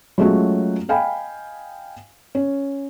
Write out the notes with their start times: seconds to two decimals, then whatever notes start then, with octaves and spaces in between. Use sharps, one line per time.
0.18 F#3 G#3 A3 C#4 F4 F#4
0.89 D#5 F5 G5 G#5 B5
2.35 C#4